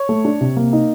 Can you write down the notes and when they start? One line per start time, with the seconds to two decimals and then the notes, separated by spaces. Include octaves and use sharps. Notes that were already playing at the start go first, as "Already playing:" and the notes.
Already playing: C#5
0.09 A3
0.25 D4
0.41 C3
0.57 A#3
0.73 D#4